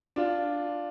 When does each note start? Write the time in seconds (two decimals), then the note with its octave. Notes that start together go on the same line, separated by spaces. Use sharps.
0.16 D4 F4